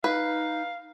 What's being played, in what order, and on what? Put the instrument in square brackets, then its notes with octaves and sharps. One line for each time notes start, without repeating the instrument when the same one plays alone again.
[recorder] D#4 [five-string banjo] B4 [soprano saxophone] F5